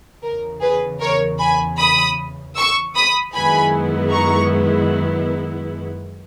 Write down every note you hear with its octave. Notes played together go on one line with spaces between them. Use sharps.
E2 C#3 E3 A#4
G#4 B4
A#4 C#5
G#5 B5
B5 D#6
C#6 E6
B5 D#6
F#2 D#3 G#3 B3 E4 G#5 B5
A#5 C#6